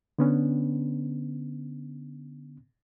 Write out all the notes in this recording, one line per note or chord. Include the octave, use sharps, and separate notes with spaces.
D3 B3 C#4 D4